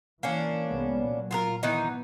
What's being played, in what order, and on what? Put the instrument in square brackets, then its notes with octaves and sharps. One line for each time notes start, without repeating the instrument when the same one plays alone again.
[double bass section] E3 [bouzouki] A#3 C#4 D4
[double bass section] C2 G#3 B3
A#2 F#3
[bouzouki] F4 G#4 A#4
[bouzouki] D#3 E3 D#4 [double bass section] B3